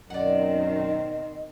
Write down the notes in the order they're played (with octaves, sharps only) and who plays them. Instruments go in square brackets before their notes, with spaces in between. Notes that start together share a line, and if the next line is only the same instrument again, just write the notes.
[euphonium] F#2 [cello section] B2 D#3 C4 [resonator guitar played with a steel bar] D5 F#5 [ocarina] D#5